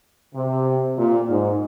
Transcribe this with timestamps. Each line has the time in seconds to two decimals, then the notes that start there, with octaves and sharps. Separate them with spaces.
0.35 C3
0.98 A#2
1.29 G#2